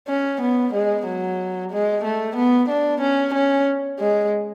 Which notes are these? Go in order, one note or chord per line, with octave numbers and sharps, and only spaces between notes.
C#4
B3
G#3
F#3
G#3
A3
B3
D4
C#4
C#4
G#3